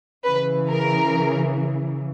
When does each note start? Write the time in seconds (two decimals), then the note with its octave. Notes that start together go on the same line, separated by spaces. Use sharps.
0.25 C#3 E3 B4
0.69 A#4